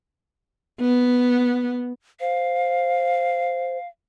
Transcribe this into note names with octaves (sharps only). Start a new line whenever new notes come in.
B3
C5 F5